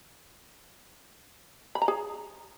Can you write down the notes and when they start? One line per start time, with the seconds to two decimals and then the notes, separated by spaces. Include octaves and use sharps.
1.75 B5
1.82 A#5
1.88 G#4